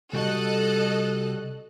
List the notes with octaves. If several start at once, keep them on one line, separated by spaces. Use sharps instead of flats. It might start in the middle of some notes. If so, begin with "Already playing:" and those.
C2 G3 F#4 A4 D#5 F#6